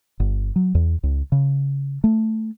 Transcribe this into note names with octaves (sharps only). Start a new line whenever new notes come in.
G1
F#3
E2
C#2
C#3
A3